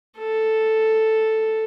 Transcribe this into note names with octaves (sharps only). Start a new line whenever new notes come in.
A4